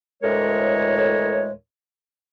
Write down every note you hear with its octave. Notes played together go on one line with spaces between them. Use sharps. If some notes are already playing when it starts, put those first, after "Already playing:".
D2 A2 E3 G#3 A#4 C#5